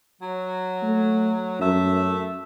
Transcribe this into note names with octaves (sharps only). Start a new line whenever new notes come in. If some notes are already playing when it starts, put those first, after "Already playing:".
F#3
A3
F#2 A3 E5